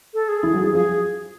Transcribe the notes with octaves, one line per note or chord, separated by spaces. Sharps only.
A4
G#4
E3 E4
F#3 F#4
G3 G4
F3 F4 G#4